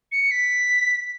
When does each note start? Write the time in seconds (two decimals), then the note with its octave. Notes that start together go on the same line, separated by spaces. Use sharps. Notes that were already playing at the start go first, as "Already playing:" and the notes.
0.12 C#7
0.31 B6